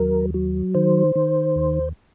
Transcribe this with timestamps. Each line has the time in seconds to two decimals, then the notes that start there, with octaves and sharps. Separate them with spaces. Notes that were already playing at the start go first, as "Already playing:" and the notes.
Already playing: D#2 F#3 A#4
0.34 F#3
0.74 D#3 C5
1.16 D#3
1.56 D#2